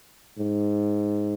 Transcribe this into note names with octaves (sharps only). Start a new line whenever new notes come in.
G#2